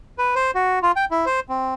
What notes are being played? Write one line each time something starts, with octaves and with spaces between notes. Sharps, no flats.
B4
C5
F#4
F4
G5
E4
C5
C4